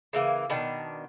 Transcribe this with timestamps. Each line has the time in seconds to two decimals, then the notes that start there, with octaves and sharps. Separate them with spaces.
0.13 C#3 E3 A#3
0.50 B2 D#3 D4